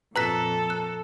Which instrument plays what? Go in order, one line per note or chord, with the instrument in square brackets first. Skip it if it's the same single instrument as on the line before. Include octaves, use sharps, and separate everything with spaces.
[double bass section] F2 A#2 [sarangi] A4 [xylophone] B4 F#6 B6 [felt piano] A#5
[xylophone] F#6